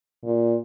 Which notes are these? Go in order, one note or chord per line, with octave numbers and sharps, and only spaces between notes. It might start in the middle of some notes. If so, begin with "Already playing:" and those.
A#2